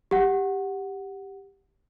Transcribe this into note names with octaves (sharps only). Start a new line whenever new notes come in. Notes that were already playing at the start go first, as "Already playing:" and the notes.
G4 F#5